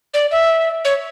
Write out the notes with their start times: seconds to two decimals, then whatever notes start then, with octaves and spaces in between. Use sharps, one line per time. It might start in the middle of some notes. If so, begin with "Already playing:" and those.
0.14 D5
0.31 E5
0.85 C#5